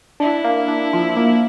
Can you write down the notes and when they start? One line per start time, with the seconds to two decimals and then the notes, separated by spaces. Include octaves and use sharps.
0.20 D4 E4
0.44 A#3
0.68 D4
0.93 F3
1.17 A#3